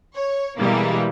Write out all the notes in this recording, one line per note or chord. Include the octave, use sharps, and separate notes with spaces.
C#5
B2 E3 G3 G#3 A#3